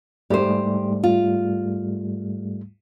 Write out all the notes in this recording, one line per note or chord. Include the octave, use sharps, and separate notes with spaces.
G#2 G3 A3 G4 C5
F4